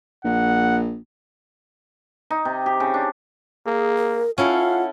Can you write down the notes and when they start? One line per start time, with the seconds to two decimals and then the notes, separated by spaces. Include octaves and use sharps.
0.25 A#1 F#5
2.30 D#4
2.45 C3
2.66 G4
2.80 C#3
2.94 D4
3.66 A#3 G#4
3.97 A#4
4.38 C#4 E4 F4 A4 F5 F#5